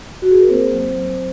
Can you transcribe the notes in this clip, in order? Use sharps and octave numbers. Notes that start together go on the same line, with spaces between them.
F#4
G#4
A#4
A#3 C4 C5
F#3
F#3